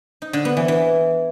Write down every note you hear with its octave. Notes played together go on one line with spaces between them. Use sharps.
D#4
D3
B3
E3
E3